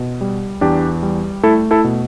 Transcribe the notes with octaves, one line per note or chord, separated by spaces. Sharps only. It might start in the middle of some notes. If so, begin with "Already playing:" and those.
Already playing: B2
G3
E2 D4 G4
G3
A3 E4 A4
E4 A4
B2